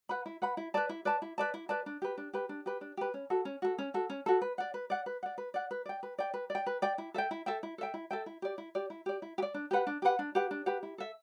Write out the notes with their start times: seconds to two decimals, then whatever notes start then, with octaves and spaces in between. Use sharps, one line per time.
0.09 B4 F#5 B5
0.26 E4
0.42 B4 F#5 B5
0.57 E4
0.74 B4 D5 A5
0.89 E4
1.05 B4 D5 A5
1.22 E4
1.38 B4 D5 A5
1.54 E4
1.69 B4 D5 A5
1.86 D4
2.02 G4 B4
2.18 D4
2.33 G4 B4
2.49 D4
2.66 G4 B4
2.81 D4
2.97 G4 B4
3.14 C#4
3.30 F#4 A4
3.45 C#4
3.62 F#4 A4
3.78 C#4
3.94 F#4 A4
4.10 C#4
4.26 F#4 A4
4.41 B4
4.58 D5 F#5
4.74 B4
4.90 D5 F#5
5.06 B4
5.23 D5 F#5
5.38 B4
5.54 D5 F#5
5.71 B4
5.86 D5 G5
6.03 B4
6.18 D5 G5
6.34 B4
6.50 D5
6.55 G5
6.66 B4
6.82 D5 G5
6.98 E4
7.14 A4 E5 G5
7.31 E4
7.46 A4 E5 G5
7.63 E4
7.78 A4 E5 G5
7.94 E4
8.11 A4 E5 G5
8.26 E4
8.42 G4 D5
8.58 E4
8.75 G4 D5
8.90 E4
9.06 G4 D5
9.22 E4
9.38 G4
9.42 D5
9.54 D4
9.71 G4 B4 F#5
9.87 D4
10.02 G4 B4 F#5
10.19 D4
10.35 G4 B4 F#5
10.51 D4
10.66 G4 B4 F#5
10.83 E4
10.98 A4 E5